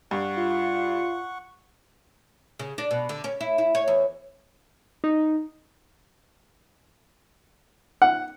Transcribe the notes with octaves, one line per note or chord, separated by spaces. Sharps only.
G2 F#5 C#6
F4
C#3
D4
B2
D3
C#4
E4
E4
C#5
E2
D#4
F#5